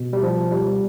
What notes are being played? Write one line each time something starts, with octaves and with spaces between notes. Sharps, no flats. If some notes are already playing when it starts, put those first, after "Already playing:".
Already playing: B2
G3
F3
G3